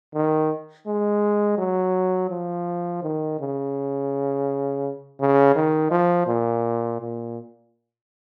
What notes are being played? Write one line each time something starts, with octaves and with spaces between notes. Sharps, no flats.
D#3
G#3
F#3
F3
D#3
C#3
C#3
D#3
F3
A#2
A#2